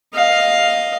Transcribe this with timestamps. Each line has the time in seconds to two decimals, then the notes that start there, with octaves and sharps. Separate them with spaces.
0.14 D#5 F5